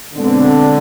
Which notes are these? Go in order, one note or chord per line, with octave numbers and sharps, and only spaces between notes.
B2 D3 G#3 C4